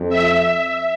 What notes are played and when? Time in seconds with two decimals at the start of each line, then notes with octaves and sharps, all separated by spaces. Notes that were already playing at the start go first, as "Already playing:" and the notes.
Already playing: F2
0.09 E5